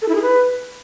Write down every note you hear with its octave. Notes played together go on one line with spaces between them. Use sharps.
A4
E4
G#4
B4